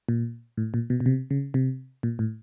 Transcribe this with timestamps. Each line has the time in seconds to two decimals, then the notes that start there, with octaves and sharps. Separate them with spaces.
0.09 A#2
0.57 A2
0.74 A#2
0.90 B2
1.00 B2
1.06 C3
1.31 C#3
1.54 C3
2.03 A#2
2.19 A2